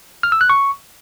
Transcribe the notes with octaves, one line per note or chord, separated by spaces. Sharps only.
F6
E6
F#6
C#6